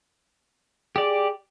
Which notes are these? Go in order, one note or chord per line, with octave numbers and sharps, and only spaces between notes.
G4 G#4 D5